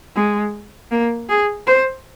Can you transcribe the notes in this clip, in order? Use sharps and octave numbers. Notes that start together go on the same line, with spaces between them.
G#3
A#3
G#4
C5